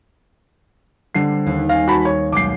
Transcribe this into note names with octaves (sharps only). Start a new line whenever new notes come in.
D3 G3 C4 C7
D#2
F5 G#5 A#6
F#4 A5 B5
C#5
B1 G#3 D6 G6 C7